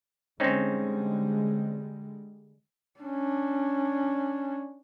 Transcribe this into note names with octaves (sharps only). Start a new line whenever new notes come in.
D3 G3 G#3 C4 C#4 D#4
C#4 D4